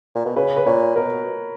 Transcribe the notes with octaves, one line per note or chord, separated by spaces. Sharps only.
A#2
B2
C#3 B4
B4
A#2 C#5
B2 A#4